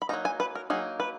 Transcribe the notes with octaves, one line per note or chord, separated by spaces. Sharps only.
B5
F#3 A#3 D#4 A#5
G#5
B4
A#4
F#3 A#3 D#4 G#4
B4